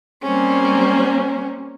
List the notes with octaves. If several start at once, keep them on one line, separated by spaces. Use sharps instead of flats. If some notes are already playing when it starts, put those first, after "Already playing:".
G3 A#3 C4 C#4